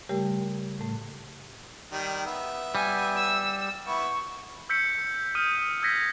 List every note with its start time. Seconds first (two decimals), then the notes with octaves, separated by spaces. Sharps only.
0.09 C#3 G3 A3 G4 A#4
0.79 A2 A3
1.92 D#3 G3
2.26 B3 E5
2.75 G3 G#5
3.16 E6
3.87 B3 E4 C#6
4.69 E6 G6 B6 C#7
5.35 D#6 F6 G6 D#7
5.82 E6 G6 G#6 A#6 B6 C#7